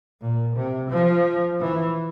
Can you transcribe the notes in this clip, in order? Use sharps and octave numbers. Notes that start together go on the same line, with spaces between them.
A#2
C3
F3
E3